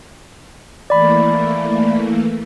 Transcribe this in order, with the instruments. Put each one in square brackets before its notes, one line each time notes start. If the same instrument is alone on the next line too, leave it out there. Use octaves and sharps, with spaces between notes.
[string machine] E3 A3 A#3 [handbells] D5 B5